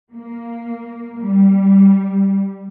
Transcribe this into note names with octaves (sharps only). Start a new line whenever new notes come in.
A#3
G3